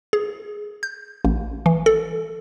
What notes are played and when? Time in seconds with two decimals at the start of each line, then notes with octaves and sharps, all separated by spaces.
0.13 G#4
0.83 G6
1.25 A1
1.66 E3
1.86 A4